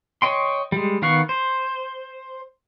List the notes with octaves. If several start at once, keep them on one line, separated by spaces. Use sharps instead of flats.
C#5 D#5 G5 C6
G3 G#3
D#3 B3 F5 F#5 C#6
C5